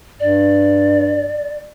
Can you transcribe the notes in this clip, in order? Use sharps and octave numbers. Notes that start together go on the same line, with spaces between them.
G2 D5